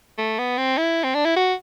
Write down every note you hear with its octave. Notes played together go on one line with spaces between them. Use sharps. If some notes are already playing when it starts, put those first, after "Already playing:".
A3
B3
C4
E4
C4
D4
E4
F#4